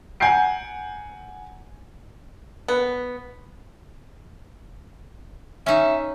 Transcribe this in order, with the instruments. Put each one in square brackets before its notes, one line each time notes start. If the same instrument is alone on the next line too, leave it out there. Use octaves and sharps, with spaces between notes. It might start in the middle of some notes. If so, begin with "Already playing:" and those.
[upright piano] F#5 G#5 A#5 G6 C7 D7
[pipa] B3
[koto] C#4 D#4 [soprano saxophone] E5